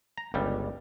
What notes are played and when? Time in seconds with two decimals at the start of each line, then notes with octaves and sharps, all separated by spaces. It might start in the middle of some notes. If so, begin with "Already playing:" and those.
0.18 A#5
0.34 G1 C#2 G3